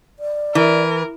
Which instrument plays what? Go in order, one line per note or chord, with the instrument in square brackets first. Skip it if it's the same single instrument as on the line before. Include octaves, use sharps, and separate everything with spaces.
[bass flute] D5
[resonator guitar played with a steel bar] E3 [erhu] A#4